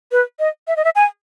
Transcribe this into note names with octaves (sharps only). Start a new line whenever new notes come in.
B4
D#5
E5
D#5
E5
G#5